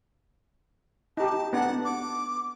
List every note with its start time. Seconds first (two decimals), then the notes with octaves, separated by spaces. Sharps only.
1.17 D#4 G4 A5
1.53 B3 D4 F#5
1.85 D6